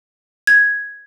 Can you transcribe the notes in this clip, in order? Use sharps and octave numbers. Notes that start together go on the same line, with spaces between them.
G#6